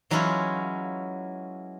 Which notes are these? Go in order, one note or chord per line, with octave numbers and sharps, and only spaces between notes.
E3 F#3 G#3 C#4 E4 F4